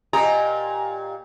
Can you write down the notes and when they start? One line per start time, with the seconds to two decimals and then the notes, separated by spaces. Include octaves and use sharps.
0.13 A#2 G4 D#5 G#5 A#5